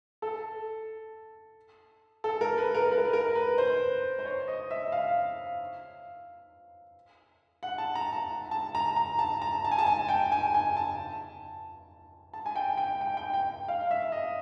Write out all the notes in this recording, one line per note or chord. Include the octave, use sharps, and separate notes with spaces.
A4
A4
A#4
B4
A#4
B4
A#4
B4
A#4
B4
C5
C5
C#5
D#5
E5
F5
F#5
A5
A#5
A5
A5
A#5
A#5
A5
A#5
A5
G#5
A5
G#5
G5
G#5
G#5
A5
A5
G#5
G5
G5
G5
G5
G5
F5
E5
D#5